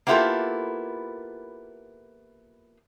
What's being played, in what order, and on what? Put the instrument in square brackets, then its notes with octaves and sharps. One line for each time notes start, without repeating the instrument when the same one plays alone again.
[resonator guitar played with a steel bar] A#3 B3 E4 F4 G4 A4